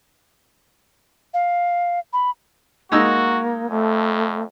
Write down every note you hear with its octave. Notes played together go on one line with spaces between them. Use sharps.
F5
B5
G#3 A#3 D#4 F#4 E6
F2 A3